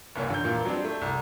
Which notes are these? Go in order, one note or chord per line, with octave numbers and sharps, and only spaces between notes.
F#1 C2 A#3 C#5
D3 G6
E1 A#2 E3 A#3
F#3 G3 C4 D4
A3
C2